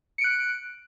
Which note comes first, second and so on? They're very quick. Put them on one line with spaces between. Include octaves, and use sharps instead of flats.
C#7 D7 F#6